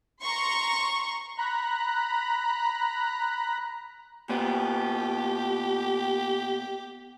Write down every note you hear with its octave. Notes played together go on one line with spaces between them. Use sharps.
A#5 C6 C#6
A#5 B5 F#6
A#2 B3 G4